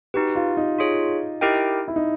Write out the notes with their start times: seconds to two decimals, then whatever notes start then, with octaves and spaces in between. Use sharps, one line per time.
0.14 D#4 F#4 G4 B4
0.35 F4
0.57 D#4
0.79 F4 G#4 C#5
1.41 E4 G4 A#4 D#5 G5
1.88 E4
1.96 D#4